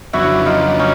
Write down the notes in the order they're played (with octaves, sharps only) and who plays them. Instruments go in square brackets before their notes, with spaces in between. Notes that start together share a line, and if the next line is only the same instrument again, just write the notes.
[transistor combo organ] F2 C#3 F#3 B3 D4 [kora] E4 F#4
[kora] D#4 F4
C#4 D#4